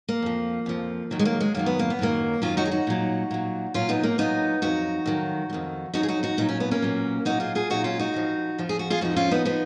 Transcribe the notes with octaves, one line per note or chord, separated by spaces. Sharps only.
A#3
F2 F3
F2 F3
F#2 D#3 F#3
G#3
A#3
G#3
F#2 D#3 F#3 A#3
B3
A#3
B3
F#2 D#3 F#3 A#3
F#2 D#3 F#3 C#4 F4
D#4 F#4
G#4
D#4 F#4
A#2 F#3
A#2 F#3
A#2 F#3 C#4 F4
B3 D#4
A#3
A#2 F#3 B3 D#4
F2 D#3 F#3 D#4 F#4
F2 D#3 F#3
F#3
F2 D#3
F2 D#3 F#3 D#4 F#4
G#4
D#4 F#4
D#4 F#4
A#2 F#3 D#4
C#4
B3
A#3 C#4
A#2 F#3
A#2 F#3 D#4 F#4
F4 G#4
F4 G#4
A#2 F#3 D#4 F#4
C#4 F4
D#4 F#4
F2 F3
F2 F3
G#4
F#4
F4 G#4
F2 F3 D#4 F#4
C#4 F4
B3 D#4
F3 B3 D#4